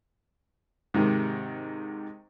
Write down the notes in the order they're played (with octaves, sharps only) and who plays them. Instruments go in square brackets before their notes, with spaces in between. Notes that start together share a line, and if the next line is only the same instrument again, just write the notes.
[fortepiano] G#2 C3 D#3